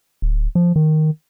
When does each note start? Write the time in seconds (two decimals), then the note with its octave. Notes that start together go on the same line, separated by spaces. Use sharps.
0.22 D1
0.55 F3
0.76 D#3